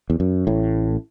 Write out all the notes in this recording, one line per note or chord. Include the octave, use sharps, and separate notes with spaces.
E2
F#2
A1 A2